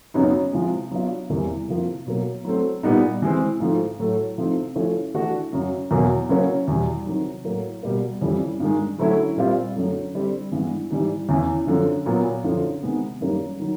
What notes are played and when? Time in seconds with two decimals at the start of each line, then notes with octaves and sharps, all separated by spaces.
0.14 F#2 C#3 F#3 B3 D#4
0.52 C3 F3 G#3
0.91 F#3 B3 D4 F4
1.30 E2 C3 E3 G3 A#3
1.68 F2 C3 F3 A#3
2.07 B2 F#3 A#3
2.45 F#3 A3 C4
2.83 A#2 G3 B3 D#4
3.22 E3 G#3 C4
3.60 G#2 F3 A3
3.99 A2 F#3 A3
4.37 C3 F3 A3 C4 D#4
4.75 F3 A3 C#4 E4
5.14 E3 A3 D4 F#4 A4
5.53 F#2 C#3 F#3
5.91 E2 B2 F#3 A#3
6.29 C#3 F#3 A#3 C#4
6.68 E2 B2 G3
7.06 C3 D#3 F#3
7.45 A2 F#3 A#3
7.83 B2 G3 A#3
8.21 F2 C#3 E3 G3
8.60 G2 D#3 G#3
8.98 D3 F#3 A3 C#4 E4
9.37 A#2 G3 C4 F4
9.75 F#2 D3 F#3 A3
10.13 D3 G3 C4
10.52 G2 E3 G#3 B3
10.90 G#2 E3 G3
11.29 E2 C#3 E3
11.67 F#2 D3 F3
12.06 A#2 F#3 B3
12.44 F#2 D3 F3
12.82 C3 D#3 G#3 B3
13.21 F#2 D#3 G3 A#3
13.60 D#3 F#3